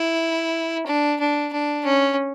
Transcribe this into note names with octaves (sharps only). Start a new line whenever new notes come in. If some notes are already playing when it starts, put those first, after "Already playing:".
Already playing: E4
D4
D4
D4
C#4